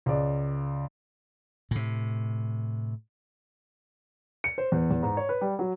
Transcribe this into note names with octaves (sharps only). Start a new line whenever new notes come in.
C#2 D5
A2 C3
C#7
C5
E2
E2
G#2
C#5
B4
G3
F#3